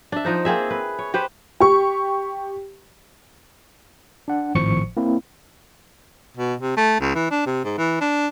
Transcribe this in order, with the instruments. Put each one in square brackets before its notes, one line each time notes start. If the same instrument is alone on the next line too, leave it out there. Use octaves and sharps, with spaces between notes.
[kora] D4 E5
F3 D#4 C5
A#3 C4 G#4 E5
B4
C#5
G4 B4 C5
[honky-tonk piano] G4 C#6
[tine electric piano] D4 F#5
G#1 A2 F3 C5 C#6 C#7
A#3 C4 E4
[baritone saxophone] B2
C3
A3
C#2
E3
D4
C3
G#2
E3
D4